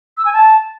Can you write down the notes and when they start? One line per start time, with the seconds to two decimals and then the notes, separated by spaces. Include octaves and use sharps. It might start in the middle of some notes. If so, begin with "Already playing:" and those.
0.17 E6
0.25 G#5
0.33 A5